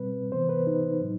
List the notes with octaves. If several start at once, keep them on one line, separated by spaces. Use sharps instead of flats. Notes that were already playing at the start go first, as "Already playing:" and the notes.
Already playing: B2 G3 C4 B4
C3 E3 B3 C5
B4
D#4
A2 F#3